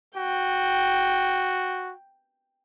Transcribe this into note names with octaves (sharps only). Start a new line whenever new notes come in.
F#4 G5